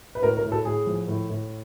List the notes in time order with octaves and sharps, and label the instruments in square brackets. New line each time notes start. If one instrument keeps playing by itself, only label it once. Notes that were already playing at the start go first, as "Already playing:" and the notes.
[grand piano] B4
A2 A#4
A#4
A2
A4
A2 G#4
F3
A2
A2